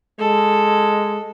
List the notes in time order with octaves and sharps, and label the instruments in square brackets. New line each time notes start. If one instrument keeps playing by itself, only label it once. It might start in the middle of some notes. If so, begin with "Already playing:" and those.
[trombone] G#3 [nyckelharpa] A4